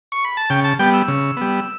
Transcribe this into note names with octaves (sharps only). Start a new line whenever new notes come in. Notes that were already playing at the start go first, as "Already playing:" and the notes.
C#6
B5
A5
C#3 G5
A5
G3 B3 G5
E6
C#3
G3 B3